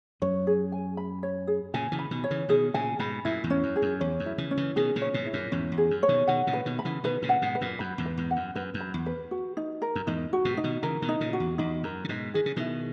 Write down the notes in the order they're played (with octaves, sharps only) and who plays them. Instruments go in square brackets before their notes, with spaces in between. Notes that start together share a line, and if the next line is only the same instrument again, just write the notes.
[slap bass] F#2 [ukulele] C#5
[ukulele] G#4
G#5
B5
C#5
G#4
[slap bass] A#2 C#3 [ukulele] G#5
[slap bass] C#3 E3
[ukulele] B5
[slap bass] B2 D#3
[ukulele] C#5
[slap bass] C#3 E3
[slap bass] B2 D#3 [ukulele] G#4
[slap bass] A#2 C#3 [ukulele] G#5
[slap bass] G#2 B2 [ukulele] B5
[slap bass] F#2 A#2 [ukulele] E4
[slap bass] E2 G#2
[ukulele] C#4
[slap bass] F#2
[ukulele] G#4
[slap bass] F#2
[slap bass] E2 [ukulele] C#5
[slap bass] F#2
[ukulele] E4
[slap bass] C#3 E3
[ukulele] C#4
[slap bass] C#3 E3
[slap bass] B2 D#3 [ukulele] G#4
[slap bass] A#2 C#3
[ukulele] C#5
[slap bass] G#2 B2
[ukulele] E4
[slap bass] F#2 A#2
[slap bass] E2 G#2 [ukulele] C#4
[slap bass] E2
[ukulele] G#4
[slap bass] F#2
[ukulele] C#5
[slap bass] B2 D#3
[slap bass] B2 D#3 [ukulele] F#5
[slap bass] A#2 C#3
[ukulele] B4
[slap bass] B2 D#3
[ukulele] B5
[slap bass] C#3 E3
[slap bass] B2 D#3 [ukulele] B4
[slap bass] A#2 C#3
[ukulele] F#5
[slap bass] G#2 B2
[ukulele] B4
[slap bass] F#2 A#2
[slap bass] F#2 [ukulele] B5
[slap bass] E2 G#2
[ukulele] B4
[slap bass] E2 G#2
[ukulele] F#5
[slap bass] F#2
[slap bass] F#2 [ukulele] B4
[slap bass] F#2
[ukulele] B5
[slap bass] E2
[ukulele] B4
F#4
D#4
A#4
[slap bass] F#2
[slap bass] E2 G#2 [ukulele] D#4
[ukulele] F#4
[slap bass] G#2 B2
[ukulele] D#4
[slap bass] B2 D#3
[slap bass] C#3 E3 [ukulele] A#4
[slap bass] B2 D#3
[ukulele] D#4
[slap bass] A#2 C#3
[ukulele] F#4
[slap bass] E2
[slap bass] E2 [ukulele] D#4
[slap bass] F#2 [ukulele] A#4
[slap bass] C#3
[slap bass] G#2 B2 [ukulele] D#4
[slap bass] D#3 [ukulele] G#4
[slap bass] C#3
[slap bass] B2 D#3 [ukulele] E4